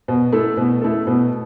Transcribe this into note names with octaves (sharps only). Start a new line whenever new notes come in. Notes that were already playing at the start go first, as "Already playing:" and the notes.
B2
A3 E4 A4
B2
A3 E4 A4
B2